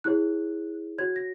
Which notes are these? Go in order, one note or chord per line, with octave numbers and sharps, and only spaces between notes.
E4 G#4 C#5 F#6
F#4 C#5 G#6
A#6